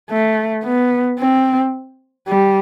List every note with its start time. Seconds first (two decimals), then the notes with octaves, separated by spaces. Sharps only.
0.10 A3
0.64 B3
1.19 C4
2.28 G3